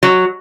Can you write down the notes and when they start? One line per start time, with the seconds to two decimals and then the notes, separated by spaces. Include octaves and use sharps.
0.03 F#3